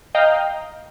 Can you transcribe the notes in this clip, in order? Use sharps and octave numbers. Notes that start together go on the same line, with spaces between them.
D#5 F5 G5 A#5